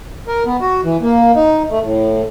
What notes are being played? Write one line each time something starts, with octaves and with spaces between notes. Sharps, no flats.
A#4
B3
F#4
E3
A#3
D#4
A3
A2